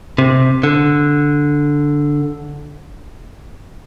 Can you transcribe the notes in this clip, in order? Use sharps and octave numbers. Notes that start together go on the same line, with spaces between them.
C3
D3